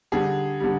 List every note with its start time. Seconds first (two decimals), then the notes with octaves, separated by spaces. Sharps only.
0.12 D3 G3 G#4
0.60 D3 G3